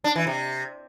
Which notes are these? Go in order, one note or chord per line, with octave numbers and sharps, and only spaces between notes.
D4
E3
C3